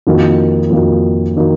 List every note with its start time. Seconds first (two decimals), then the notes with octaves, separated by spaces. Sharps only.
0.07 F2 D#3 A#3 D#4 F#4
0.70 F2 D#3 A#3 D#4 F#4
1.36 D#3 A#3 D#4 F#4